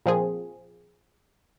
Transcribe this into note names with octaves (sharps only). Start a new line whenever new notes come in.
A#2 F3 C4 G#4